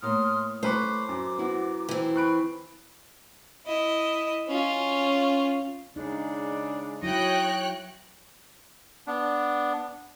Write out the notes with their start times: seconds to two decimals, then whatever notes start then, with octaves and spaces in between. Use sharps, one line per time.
0.02 A2 A#3 C6 D#6 F6
0.63 A3 B4 C5 C#6 D6
1.09 F#2
1.38 B3 E4 F#4
1.89 E3 C4
2.16 B5 C#6 F#6 D7
3.66 E4 D#5
4.48 C#4 F4
5.96 C#3 G#3 D4 D#4
7.03 F#3 E4 C#5 D#5 G5 F#6
9.07 B3 D4